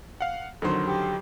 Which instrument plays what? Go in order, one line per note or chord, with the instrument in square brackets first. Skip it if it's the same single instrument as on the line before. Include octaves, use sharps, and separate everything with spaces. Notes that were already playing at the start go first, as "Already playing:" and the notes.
[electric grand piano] F5 F#5
[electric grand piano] F2 D#3 F#3 [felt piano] D3 C5
[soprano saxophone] G4